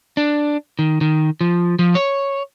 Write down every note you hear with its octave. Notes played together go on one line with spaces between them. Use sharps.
D4
D#3
D#3
F3
F3
C#5